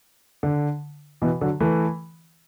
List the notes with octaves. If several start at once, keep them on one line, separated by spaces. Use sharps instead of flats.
D3
B2 E3
D3 F#3
E3 A3